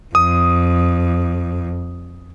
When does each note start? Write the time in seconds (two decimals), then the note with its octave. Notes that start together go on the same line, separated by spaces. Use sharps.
0.15 F2 D#6